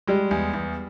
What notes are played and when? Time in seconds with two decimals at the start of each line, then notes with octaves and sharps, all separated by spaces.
0.07 G3 G#3
0.31 E2
0.54 E2